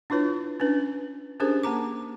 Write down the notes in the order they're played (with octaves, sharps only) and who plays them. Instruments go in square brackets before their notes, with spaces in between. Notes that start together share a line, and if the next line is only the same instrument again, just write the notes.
[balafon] D4 E4 F4 B4 C#5
C#4 D4 B4
C#4 D4 G4 G#4 A#4 C5
A#3 A5 A#5 D6